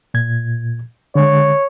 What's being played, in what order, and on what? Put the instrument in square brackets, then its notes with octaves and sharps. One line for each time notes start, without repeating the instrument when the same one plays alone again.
[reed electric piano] A#2 G#6
[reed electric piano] D3 G#3 [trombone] C#5